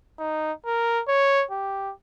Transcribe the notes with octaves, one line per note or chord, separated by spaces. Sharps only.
D#4
A#4
C#5
G4